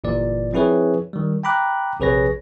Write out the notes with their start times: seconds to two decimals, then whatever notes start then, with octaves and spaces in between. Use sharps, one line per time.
0.04 G1 A#2 E3 D5
0.53 F3 C4 E4 G#4 B4 C#5
1.13 D#3 G3
1.43 G5 A#5 B5 D6 F#6
2.00 A#1 C3 G#4 B4 C#5 A#6